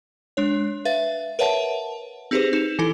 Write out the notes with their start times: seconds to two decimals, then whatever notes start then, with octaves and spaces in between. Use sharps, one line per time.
0.37 G#3 D4 C#5
0.85 B4 E5 F5 A6
1.39 A#4 B4 C#5 E5 F#5 A5
2.31 C4 D#4 G4 G#4 B4 C5
2.53 D#4 E7 F7
2.79 E3 E4 A4